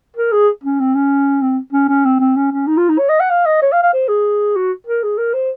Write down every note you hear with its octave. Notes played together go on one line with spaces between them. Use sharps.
A#4
G#4
C#4
C4
C#4
C4
C#4
C#4
C4
C4
C#4
C#4
D#4
F4
D#4
C#5
D#5
F#5
F5
D#5
C#5
F5
F5
C5
G#4
F#4
A#4
G#4
A#4
C5